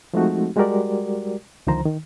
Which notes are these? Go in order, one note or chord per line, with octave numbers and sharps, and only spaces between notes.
F3 G#3 A3 C4 D#4 F#4
G3 G#3 F#4 G4 A#4 D5
C#2 D3 D#3 F3 C5 A#5
D#3